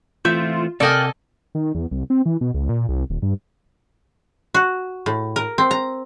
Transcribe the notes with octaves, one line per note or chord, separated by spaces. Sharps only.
E3 A3 C4 F4 E5 G6
C3 A#3 A4 D5 D#5 G5 G#5
D#3
E2
C2
C4
E3
B2
C#2
A#2
C2
D#1
G2
F#4
A2
A#4
C4
A#5